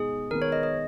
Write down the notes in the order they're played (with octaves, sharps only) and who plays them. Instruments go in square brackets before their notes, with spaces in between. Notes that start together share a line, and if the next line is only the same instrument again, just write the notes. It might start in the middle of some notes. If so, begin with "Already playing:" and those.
Already playing: [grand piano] B2 G#3 D#4 [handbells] G#4
[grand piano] D#3 G#3 B3 [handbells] A#4
[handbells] C#5
D#5
D#5